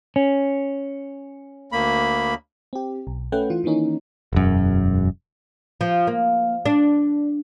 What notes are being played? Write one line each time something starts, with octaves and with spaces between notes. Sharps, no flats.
C#4
D2 A#3 B5
C4 G4
B1
A3 C#4 B4 F#5 G5
E3 F4
D#3 E3 A#3 C#4 D#4
E1 F#2
F3
A#3
D4